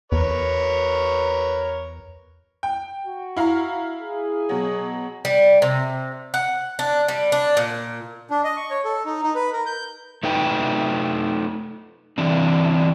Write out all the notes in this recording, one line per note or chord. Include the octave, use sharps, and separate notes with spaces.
E2 A#4 B4 C#5
G5
F#4
E4 F5 A#5
G#4
B2 F#3
G3
C3
F#5
D4
G3
D4
A#2
D4
D#5
C#6
C#5
A4
D#4
D#4
B4
A#4
G6
A3 D#4 B4 G5
D3 E3 C4 D4